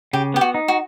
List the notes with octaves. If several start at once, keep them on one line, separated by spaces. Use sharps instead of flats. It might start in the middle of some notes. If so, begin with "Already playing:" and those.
C#3 G4
B3 G4
F#4
D#4
F#4